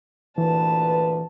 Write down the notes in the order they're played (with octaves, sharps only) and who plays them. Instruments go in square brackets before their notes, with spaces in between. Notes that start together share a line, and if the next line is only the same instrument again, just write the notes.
[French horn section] D2 A#2 B4 [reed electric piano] E3 [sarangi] A5